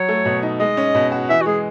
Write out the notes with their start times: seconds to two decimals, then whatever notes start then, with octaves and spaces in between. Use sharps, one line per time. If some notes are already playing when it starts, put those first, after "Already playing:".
Already playing: F#3 C#5
0.08 A3
0.25 B2
0.43 D#4
0.60 G#3 D#5
0.77 C#4
0.95 B2
1.12 F#4
1.29 E3 E5
1.41 F#4
1.46 G#3 G#4